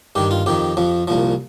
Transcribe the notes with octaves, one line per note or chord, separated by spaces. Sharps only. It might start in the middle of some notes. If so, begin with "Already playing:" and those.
G2 D#3 G4
F4
F2 D#3 G4
F2 F3
C2 A#2 F3